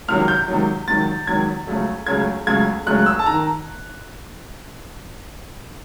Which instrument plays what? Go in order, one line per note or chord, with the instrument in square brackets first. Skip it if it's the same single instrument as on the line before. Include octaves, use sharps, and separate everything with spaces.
[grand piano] C#2 C3 D#3 F#3 F6
G6
C#2 C3 D#3 F#3
C#2 C3 D#3 F#3 A6
C#2 C3 D#3 F#3 G#6
C#2 C#3 F#3 A3
C#2 C#3 F#3 A3 G#6
C#2 C#3 F#3 A3 G#6
C#2 C#3 F#3 A3 F#6
E6
A5
D#3 A#5